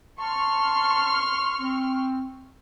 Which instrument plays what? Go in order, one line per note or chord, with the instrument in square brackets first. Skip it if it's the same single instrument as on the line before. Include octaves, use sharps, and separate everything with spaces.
[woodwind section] A5 [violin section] C6 C#6 F6
[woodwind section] C4